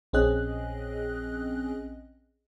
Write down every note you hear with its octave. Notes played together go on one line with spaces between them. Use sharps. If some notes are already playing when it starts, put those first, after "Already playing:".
A#1 C4 C#4 G#4 D#5 F#6